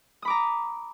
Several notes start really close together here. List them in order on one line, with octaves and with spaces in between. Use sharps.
D#6 B5 D6 A#5